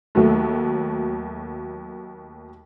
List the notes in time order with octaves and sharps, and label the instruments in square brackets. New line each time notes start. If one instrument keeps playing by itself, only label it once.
[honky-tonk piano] D#2 F#3 A3